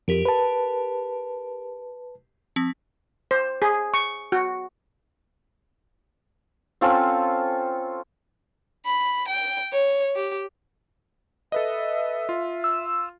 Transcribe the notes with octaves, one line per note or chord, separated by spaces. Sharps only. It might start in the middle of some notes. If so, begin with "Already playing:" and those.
F2 G4 A#4 D7
B4 A5
F3 C4 B6
C5
G#4
C#6
F#4
C4 C#4 F4 A4
B5
G5
C#5
G4
A4 B4 D#5 E5
F4
E6